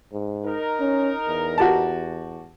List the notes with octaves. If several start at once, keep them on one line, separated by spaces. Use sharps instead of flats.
G#2
D#4 A#4
C#4
E2
F#4 G4 A5